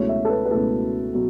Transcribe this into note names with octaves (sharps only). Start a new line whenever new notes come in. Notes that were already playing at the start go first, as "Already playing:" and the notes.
Already playing: C#2 B2 F#3 A3 E4 C#5
E5
A4
B4
B4
C#2 B2 F#3 A3 E4 A4
B2 F#3